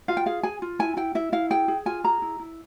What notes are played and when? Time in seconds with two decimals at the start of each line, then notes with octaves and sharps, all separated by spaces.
0.08 F4 F5
0.17 G5
0.26 G#4 F5
0.43 G#4 G#5
0.62 F4
0.79 E4 G#5
0.97 E4 G5
1.15 E4 E5
1.32 E4 F5
1.50 G#4 G5
1.68 G#4
1.86 F4 G#5
2.04 G#4 A#5
2.22 E4
2.40 E4